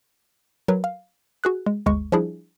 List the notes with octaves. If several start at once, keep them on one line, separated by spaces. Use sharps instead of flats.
F#3 A#4 B4
F5
F#4 G#4 F#6
G#3
G1 D2 G#3 C#6
F3 G3 D4 E4 G#4